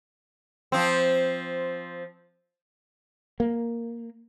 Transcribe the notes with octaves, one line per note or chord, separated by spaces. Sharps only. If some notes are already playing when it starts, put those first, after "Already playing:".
F3 C4
A#3